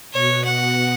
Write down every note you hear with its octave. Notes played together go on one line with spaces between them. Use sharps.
B2 B3 F#4 C#5
F#5